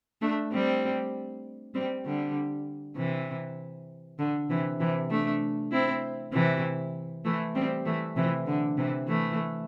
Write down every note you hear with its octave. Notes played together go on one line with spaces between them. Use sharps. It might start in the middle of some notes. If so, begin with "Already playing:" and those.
A3 D4
G3 C4
G3 C4
D3 G3
C3 E3
D3
C3 E3
C3 E3
A3 D4
C4 E4
C3 E3
E3 A3
G3 C4
E3 A3
C3 E3
D3
C3 E3
E3 A3